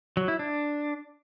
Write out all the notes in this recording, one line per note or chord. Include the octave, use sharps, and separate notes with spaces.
F#3
E4
D4